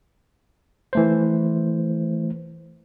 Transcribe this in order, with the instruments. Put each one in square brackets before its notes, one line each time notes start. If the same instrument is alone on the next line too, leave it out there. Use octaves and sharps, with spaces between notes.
[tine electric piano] E3 A3 C5